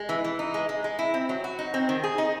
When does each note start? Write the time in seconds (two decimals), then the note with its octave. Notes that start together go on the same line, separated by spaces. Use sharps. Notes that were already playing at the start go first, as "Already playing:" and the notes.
Already playing: G#3
0.09 E3
0.24 E3
0.39 D#4
0.54 G#3
0.69 G#3
0.84 G#3
0.99 E4
1.14 C4
1.29 F#3
1.44 F#4
1.59 D#4
1.74 C4
1.89 D#3
2.03 G#4
2.18 D#4